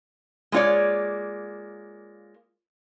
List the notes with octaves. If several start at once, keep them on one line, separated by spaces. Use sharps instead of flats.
G#3 A#3 F4 C#5 D5